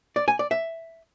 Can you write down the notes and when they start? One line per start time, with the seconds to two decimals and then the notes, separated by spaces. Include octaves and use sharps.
0.16 D5
0.28 G#5
0.39 D5
0.51 E5